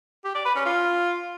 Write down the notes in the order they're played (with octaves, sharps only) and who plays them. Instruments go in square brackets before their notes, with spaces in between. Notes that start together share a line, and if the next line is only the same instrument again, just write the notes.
[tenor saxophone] G4
D5
B4
C#4
F4